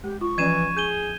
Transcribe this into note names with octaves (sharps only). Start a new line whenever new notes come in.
G#3 G4
F4 C#6
E3 F3 C#4 D5 G#6 D#7 E7
G#4 G6 D#7 G7